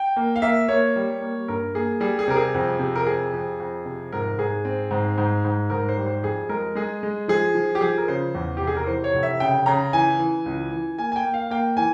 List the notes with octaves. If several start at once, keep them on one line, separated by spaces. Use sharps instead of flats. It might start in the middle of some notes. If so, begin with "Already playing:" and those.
Already playing: G5
A#3
F5
A#3 E5
A#3 C#5
G3
A#3
G2 A#4
A#3 G#4
G3 G#4
G#4
C3 A#4
G#4
F2
C3
A#4
F2 G#4
F2
F2
C3
G#2 A#4
G#2 G#4
C4
G#2
G#2
G#2
G#2 A#4
C5
G3
C5
F2 G#4
G#3 A#4
G#3 G#4
G#3
F3 G#4
F3
G4
F3 G#4
A#4
C#3 C5
E2
F1 G4
G#4
A#4
E3 C5
C#5
F1
E5
C#3 G5
C#3 A#5
E3 G#5
E3
C#2
E3
A#3 G#5
G#5
G5
A#3
F5
A#3 G5
E3 G#5